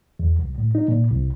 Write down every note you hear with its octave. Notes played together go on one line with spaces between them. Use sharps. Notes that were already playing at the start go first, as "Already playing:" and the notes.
E2
C2
A2
D#4
A#2
C2